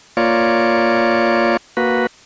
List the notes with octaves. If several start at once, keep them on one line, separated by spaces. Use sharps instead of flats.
A#3 F4 C#5 D5
A#3 F#4 B4